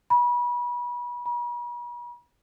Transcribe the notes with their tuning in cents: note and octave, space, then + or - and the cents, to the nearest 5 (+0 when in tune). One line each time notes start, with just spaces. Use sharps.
B5 -30
B5 -45